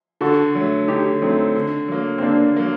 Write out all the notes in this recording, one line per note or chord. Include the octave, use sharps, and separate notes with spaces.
D3 F#4 A4
F#3 A3
D3 D#4 G4
F#3 A3 C4 D#4
D3
F#3 A#3
C4
D3 A#3 D4
F#3 A#3